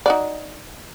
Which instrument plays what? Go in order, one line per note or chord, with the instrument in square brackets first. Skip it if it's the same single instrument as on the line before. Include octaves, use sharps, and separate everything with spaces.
[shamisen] D#4 F#4 D5